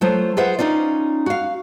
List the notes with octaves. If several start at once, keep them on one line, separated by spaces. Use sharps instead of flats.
F#3 A3 F4 C5
F4 G#4 B4 C5 E5 F#5
C#4 D#4 F4 D5
F#4 F5